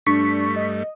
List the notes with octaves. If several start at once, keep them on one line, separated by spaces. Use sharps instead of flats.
G2 A3 D4 C#6 B6
D#5